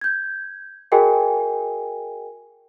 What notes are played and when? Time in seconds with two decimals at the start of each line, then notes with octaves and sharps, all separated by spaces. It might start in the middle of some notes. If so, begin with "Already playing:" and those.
0.01 G6 G#6
0.92 F#4 G#4 A#4 D#5 G5 G#5